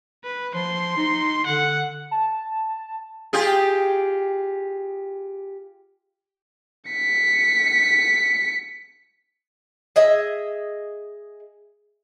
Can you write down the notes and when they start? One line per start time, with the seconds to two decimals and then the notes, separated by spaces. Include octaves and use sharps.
0.24 B4
0.55 F3 C6
0.97 D#4
1.46 D3 F#5
2.11 A5
3.33 F4 G4 G#4
6.91 B6 C#7
9.96 G#4 D#5 E5